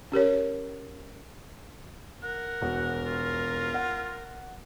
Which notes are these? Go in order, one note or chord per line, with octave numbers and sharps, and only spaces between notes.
C#4 G4 A#4 C#5
A#4 F#5
E1 F#4
F4
F#5